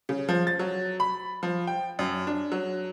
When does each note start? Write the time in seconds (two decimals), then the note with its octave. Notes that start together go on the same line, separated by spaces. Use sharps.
0.09 C#3
0.29 F3
0.47 A6
0.59 F#3
1.00 B5
1.43 F3
1.67 G5
1.99 F#2
2.27 D4
2.52 F#3